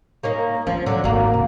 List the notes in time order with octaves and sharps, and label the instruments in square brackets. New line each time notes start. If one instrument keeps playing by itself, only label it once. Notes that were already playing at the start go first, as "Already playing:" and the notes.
[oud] A#3 C#4 D#4
[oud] F3 [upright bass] C#4
[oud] D3 F#3
[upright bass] G#1 [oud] A#3 F#4
[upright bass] C#3